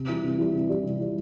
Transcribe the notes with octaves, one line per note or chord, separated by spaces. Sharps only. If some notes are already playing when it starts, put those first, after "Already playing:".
Already playing: C3
E3 G3
C3
E3 G3
C3
E3 G3
C3
E3 G3